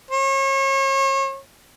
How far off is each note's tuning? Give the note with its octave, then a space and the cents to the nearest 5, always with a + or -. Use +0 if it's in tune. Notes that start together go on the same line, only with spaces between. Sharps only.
C#5 -35